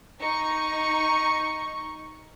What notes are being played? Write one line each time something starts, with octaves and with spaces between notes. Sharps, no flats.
D#4 C#6